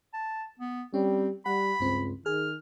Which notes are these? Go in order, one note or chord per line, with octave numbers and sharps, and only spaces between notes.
A5
B3
G3 C4 C#4
G3 F#5 B5
C#2 G2 C4
D#3 G#4 F6